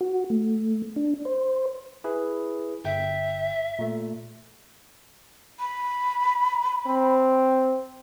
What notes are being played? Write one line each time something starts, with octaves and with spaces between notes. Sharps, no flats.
F#4
A3
D4
C5
E4 G#4 B4
G1 E5 G5
A#2 A3
B5
C4